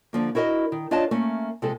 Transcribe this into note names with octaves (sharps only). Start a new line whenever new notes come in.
D3 F3 A#3
E4 F#4 A#4 D5 D#5
D#3
D4 F4 C#5 D#5 F5 A5
A3 A#3 C#4
C3 F3 G#3 C4 A4